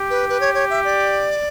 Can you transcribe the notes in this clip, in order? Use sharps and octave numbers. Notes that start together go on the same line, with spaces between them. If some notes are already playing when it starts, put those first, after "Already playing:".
Already playing: G4
B4
B4
C#5
C#5
E5
D5